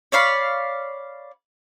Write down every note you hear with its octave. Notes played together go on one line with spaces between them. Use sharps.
C#5 D5 F5 B5